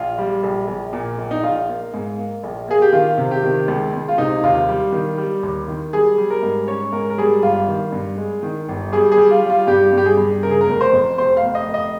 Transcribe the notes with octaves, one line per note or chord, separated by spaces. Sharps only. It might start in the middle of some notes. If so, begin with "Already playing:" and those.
Already playing: A#1 F4
G3
A#1
A#1
A#2
A#1
D#4
A#1 F4
A#3
G#2
A#3
A#1
A#3 G#4
G4
D#3 F4
C3
G4
D#3
C#2
C#2
F4
C3 D#4
D#2 F4
G3
D#3
G3
D#2
D#3
G3 G#4
G3
A#4
G#2
C#4 C#5
G#2 A#4
A#4
G3 G#4
G1 F4
D#3
G2
G#3
D#3
G1
G3 G#4
G#4
G3
F4
G3
F4
G2 G4
G2 G4
G#4
G2
C#3 A#4
G#4
A#4
F1
C5
F2
F1 C5
F5
F1
D#5
F1
D#5